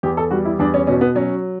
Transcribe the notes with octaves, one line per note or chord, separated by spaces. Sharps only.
E2 G4
A4
G3 F#4
E4
E2 D4
C#4
B2 C#4
B3
F#3 C#4